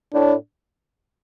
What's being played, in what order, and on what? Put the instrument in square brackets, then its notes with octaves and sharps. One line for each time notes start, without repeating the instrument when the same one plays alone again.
[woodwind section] A2 [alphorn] D4